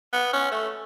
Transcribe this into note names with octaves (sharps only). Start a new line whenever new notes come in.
B3
C#4
A3